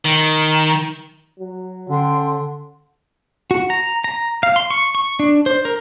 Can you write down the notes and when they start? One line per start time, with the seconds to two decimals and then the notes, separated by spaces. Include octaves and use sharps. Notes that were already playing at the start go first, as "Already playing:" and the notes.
0.05 D#3
1.40 F#3
1.90 D3 C#4 G5 C6
3.51 F#4
3.70 A#5
4.04 A#5
4.43 F5
4.56 C6
4.71 C#6
4.95 C#6
5.20 D4
5.46 C5
5.65 A#4